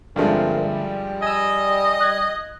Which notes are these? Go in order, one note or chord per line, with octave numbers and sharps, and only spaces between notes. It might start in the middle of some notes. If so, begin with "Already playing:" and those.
G2 D3 F3 G#3 A3 C4 A#4
G3
D#5 G#5 E6
F#6 G#6